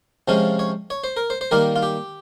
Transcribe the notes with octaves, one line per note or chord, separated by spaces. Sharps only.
C3 F3 G#3 C#4 F4
C#5
C#5
C5
A#4
C5
C5
D#3 G3 A#3 F4 A#4
F4
G4